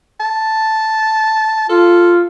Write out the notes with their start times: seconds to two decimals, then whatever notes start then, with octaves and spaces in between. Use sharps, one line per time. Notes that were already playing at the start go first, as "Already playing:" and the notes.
0.20 A5
1.69 F4 A4